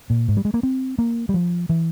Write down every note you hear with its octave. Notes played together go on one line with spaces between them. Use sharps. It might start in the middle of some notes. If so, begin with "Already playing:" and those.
A#2
G#2
G3
G#3
A#3
C4
A#3
G3
F3
E3